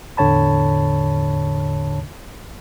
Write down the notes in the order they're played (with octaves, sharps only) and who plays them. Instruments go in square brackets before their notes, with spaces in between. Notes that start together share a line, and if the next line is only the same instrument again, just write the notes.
[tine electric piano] E2 A2 D3 C#5 A5 B5